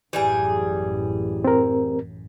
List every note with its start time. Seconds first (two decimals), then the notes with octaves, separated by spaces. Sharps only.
0.13 A1 F#2 E3 G3 G#4
1.44 C4 A#4